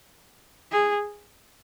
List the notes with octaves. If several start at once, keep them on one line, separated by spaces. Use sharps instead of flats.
G#4